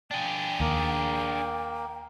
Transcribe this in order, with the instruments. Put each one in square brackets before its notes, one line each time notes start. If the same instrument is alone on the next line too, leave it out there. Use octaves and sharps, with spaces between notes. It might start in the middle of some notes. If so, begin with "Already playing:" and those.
[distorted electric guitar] D4 G#4 [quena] G5
[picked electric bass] D#2 [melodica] A#3